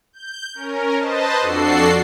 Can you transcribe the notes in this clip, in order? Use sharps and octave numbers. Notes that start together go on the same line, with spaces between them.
G6
C#4 A#4
B4 C5 D#5 A5
F2 D4 F#4 A4 C7